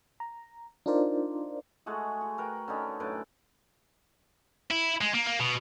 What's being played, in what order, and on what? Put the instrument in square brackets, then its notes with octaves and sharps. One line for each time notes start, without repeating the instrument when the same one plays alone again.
[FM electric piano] A#5
D4 D#4 F4 A#4 C5 D5
[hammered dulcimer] G#3 A3 F#4 G#4
F#4
F#4 A#4 B4 G5
D3 C#4 D#4
F#2 A2 B4 D6
[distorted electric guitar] E4
G#3
A#3
A#3
B2